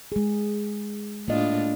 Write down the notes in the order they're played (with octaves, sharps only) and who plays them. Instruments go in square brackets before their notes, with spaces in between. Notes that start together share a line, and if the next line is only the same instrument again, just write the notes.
[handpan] G#3 G#4
[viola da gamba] A2 D4 F4 [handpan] A#3 D#5